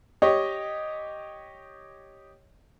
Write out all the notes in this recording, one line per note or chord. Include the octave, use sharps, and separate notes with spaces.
G4 C#5 D#5